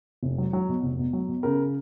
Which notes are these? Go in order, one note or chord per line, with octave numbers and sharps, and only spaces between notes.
F1
F#3
F#3
B2
F1
B2
F#3
B2
C#3 A#4